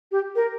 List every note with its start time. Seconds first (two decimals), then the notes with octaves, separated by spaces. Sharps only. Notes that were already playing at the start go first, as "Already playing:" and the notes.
0.12 G4
0.36 A#4